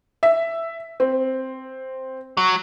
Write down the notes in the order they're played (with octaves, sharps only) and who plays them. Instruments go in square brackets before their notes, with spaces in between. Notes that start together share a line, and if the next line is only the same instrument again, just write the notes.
[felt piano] E5
C4
[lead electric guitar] F#3